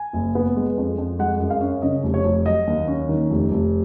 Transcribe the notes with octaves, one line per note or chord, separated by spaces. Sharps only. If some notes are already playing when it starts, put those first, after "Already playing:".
Already playing: G#5
F#1
B3
G#3
F2
F2
G#3 F#5
F#2
F5
C#4
C#3 D#5
F1
C#5
F1
F#3 D#5
D#2
C#4
D#3
F1
F1